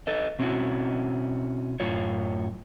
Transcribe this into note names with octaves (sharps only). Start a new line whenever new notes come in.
A4 B4 D#5
B2 C4 C#4 D#4 E4 F#4
F#2 A2 F4 C#5